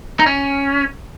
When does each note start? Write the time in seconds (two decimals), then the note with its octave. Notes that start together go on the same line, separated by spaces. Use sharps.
0.20 D#4
0.26 C#4